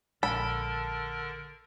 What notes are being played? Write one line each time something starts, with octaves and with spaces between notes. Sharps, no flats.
A#1 D3 G#3 A4 A#4 B5